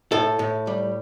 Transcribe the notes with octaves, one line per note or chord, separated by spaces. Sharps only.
A2 A4
A2
G3